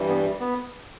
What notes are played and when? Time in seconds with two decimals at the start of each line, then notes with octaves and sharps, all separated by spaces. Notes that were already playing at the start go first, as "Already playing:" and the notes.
Already playing: G2 E3 G3
0.09 B3
0.40 B3